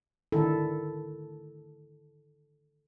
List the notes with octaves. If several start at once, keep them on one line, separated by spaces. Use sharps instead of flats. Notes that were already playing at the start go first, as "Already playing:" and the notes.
D3 D#3 E4 A4